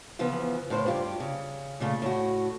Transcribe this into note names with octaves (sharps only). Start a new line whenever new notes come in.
C#3 E3 F3 B3
A2 C#3 C5
G2 F4 G4
C#3
A#2 C#3 A3
A2 F#4